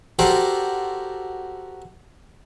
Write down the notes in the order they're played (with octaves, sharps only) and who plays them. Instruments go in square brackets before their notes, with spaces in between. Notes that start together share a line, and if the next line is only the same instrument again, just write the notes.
[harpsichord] F#4 G4 A4 A#4 C5 D5